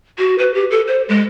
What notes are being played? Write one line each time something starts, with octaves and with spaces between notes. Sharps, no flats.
F#4
B4
G4
A4
C5
G#3